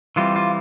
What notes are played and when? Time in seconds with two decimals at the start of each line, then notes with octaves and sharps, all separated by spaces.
0.16 E3 G3 C4 F4
0.36 F4